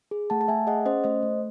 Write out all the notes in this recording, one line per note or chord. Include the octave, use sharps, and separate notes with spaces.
G#4
A3 F#5 A5
A5
A3 E5 G#5
G#4 D#5 F#5
C#4 C5 D#5
A3 C5 D#5
A3